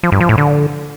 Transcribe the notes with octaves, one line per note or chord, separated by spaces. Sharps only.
F3
G2
F3
A2
D3